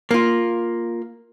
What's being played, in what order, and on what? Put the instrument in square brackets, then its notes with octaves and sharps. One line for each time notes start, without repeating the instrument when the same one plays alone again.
[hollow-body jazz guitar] A#3 F4